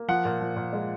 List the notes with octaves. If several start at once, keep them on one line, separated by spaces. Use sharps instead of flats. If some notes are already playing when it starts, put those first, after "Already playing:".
Already playing: A#3
F3 F#5
A#2
F3
A#2
G#3